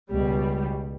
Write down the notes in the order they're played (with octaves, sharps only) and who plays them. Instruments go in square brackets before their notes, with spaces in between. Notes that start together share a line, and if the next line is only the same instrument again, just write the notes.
[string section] C#2 B2 G3